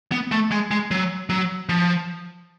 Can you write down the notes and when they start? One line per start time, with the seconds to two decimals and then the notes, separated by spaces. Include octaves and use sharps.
0.12 B3
0.32 A3
0.52 G#3
0.71 G#3
0.91 F#3
1.30 F#3
1.69 F3